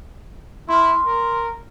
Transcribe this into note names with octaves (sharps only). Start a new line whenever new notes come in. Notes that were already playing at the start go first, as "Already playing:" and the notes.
E4 C6 F6
A#4